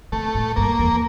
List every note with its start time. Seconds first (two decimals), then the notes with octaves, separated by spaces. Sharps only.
0.12 C3 A3
0.35 A2
0.56 G2 A#3
0.79 E2